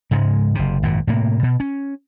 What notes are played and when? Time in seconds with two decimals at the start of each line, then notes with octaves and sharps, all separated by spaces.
0.11 G#2 C#3 G#3
0.55 F#1 C3
0.83 G#1 F#2 A#2
1.07 A2 C3 A#3
1.43 B2
1.60 C#4